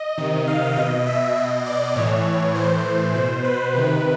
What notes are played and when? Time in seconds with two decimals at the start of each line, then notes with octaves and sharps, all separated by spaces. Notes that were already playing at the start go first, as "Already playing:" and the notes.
Already playing: D#5
0.18 C3 D#3
0.48 F5
0.77 B2 D#5
1.07 E5
1.36 B2 D#5
1.66 D5
1.96 A2 E3 C#5
2.55 A2 E3 C5
3.14 B2 C5
3.44 B4
3.74 C3 D#3